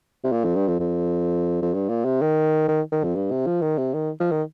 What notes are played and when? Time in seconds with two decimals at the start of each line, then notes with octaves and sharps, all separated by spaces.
0.24 C3
0.32 A#2
0.44 F2
0.56 G2
0.68 F2
0.80 F2
1.62 F2
1.74 G2
1.89 A#2
2.05 C3
2.21 D#3
2.68 D#3
2.92 D#3
3.04 F2
3.15 G2
3.31 C3
3.46 F3
3.62 D#3
3.78 C3
3.94 D#3
4.20 F3
4.31 D#3